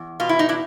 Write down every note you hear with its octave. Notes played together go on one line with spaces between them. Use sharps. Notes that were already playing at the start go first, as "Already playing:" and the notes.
Already playing: E2
B2 F4
E4
D#4
D4 E4